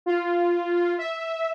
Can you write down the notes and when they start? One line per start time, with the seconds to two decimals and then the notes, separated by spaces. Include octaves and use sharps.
0.06 F4
0.98 E5